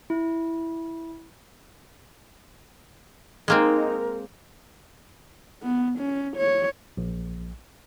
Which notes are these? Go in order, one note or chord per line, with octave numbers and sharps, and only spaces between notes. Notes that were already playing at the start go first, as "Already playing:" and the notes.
E4
G#3 A#3 C4 D#4 A#4
B3
C#4
C#5
A#1